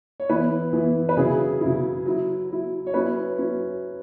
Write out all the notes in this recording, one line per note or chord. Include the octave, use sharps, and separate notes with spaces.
C#5
E3 B3 E4 B4
E3 B3 E4
B4
C#3 F#3 E4 G#4
C#3 F#3 E4
F#3 E4
F#3 E4
C#5
F#3 C#4 E4 B4
F#3 C#4 E4